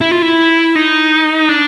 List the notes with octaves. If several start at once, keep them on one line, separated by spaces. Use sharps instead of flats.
E4
F4
E4
D#4
D4